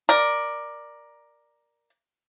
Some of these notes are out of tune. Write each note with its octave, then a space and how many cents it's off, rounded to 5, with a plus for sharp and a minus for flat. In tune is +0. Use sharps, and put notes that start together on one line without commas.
A#4 +10 D5 +10